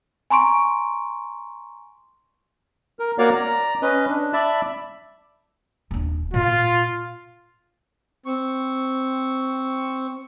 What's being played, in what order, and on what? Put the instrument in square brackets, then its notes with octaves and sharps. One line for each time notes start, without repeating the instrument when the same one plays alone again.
[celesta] G#5 A#5 C6 C#6 D7
[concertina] A#4
A#3 F#4 A#4 C#5 D5 F5
D5 A#5
C#4 B4 D#5
D4
D5 E5 A5 B5
[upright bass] D#1 D4
[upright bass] A#2 [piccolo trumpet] F4
[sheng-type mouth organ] C4 C#6